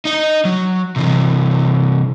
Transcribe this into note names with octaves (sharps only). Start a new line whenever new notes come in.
D#4 D#5
F#3
C3 E3